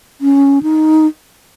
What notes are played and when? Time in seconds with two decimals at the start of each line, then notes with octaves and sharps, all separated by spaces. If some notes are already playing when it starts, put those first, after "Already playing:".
0.21 C#4
0.63 D#4